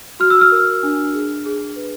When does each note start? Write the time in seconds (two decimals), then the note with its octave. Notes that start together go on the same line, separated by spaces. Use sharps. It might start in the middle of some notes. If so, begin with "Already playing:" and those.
0.20 F#4 F6
0.30 E6
0.41 F6
0.52 A#4
0.83 D4
1.13 G#4
1.45 G#4
1.76 B4